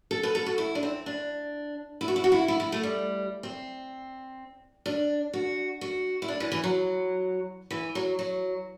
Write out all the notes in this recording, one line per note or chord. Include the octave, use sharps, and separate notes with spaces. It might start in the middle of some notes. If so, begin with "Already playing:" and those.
A4
B4
A4
F#4
E4
D4
C4
D4
E4
F#4
E4
F#4
E4
E4
E4
A3
G3
C4
D4
F#4
F#4
E4
D4
E3
E3
F#3
E3
F#3
F#3